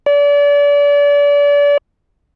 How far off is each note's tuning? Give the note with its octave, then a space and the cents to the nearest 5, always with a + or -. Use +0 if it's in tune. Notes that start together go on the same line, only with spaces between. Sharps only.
D5 -35